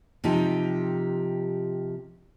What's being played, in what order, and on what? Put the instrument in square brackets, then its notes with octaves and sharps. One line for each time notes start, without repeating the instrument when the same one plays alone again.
[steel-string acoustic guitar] C3 F3 D#4 G4